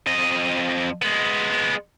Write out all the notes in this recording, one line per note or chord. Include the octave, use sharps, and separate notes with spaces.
F2 D#5
G#3 B3